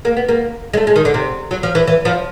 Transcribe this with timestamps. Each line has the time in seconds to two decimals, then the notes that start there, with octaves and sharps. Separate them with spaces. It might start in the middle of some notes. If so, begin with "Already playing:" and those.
0.05 A#3
0.17 B3
0.28 A#3
0.73 G#3
0.77 A3
0.87 G#3
0.96 D#3
1.05 D3
1.14 C3
1.51 F#3
1.63 F3
1.75 E3
1.87 E3
2.05 F3